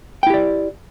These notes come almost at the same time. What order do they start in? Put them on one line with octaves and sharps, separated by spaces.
G5 E4 G4 D5